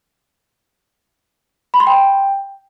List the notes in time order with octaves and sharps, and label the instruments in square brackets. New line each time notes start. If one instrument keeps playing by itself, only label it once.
[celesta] B5
C6
G5